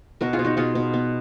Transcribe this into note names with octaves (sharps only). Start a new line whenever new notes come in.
B2 F#4 A#4
F4 G#4
B2
D#4 F#4
B2 F4 G#4
B2
B3